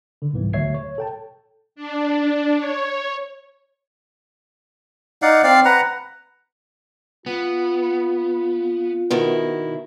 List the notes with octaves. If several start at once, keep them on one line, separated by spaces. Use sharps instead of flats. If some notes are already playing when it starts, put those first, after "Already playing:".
D3
C2 G#2 E3 G3 B3
D2 F#3 C#5 E5 G#6 C7
C#5
A4 G5 A5
D4
C#5
D#4 D5 F5 F#5
C4 D5 F5
B4 F#5 A#5
B3 F4
B2 D#3 B3 E4